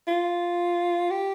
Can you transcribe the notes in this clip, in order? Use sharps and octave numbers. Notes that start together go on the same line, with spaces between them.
F4
G4